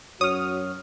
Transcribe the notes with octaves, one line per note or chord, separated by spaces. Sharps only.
F#2 F#4 C#5 D#6 F6